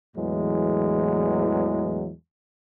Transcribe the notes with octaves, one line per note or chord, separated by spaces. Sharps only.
E2 A2 E3 F#3 G#3